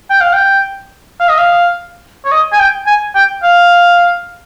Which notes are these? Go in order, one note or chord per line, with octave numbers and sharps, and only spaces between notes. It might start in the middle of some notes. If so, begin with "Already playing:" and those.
G5
F5
G5
F5
D#5
F5
C#5
D#5
G#5
G5
G#5
G5
F5